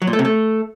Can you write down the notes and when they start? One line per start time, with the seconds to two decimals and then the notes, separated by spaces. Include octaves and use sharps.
0.02 F#3
0.07 A#2
0.13 A3
0.19 C3
0.25 A3